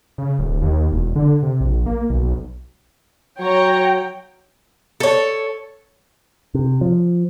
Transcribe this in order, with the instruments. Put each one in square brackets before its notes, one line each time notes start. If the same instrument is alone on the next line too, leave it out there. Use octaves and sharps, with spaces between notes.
[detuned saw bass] C#3
D1
D#2
E1
D3
C3
A#1
A#3
B1
[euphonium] F#3 [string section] C#5 A#5 [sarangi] G5
[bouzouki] A4 C#5
[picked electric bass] C3
F3